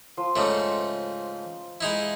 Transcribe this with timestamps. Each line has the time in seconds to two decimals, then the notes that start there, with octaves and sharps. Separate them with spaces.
0.17 F3 C6
0.36 G#2 C#3 A3
1.81 G#3 D#4 E4